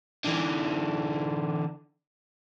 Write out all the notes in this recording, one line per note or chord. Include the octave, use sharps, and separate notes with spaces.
D3 E3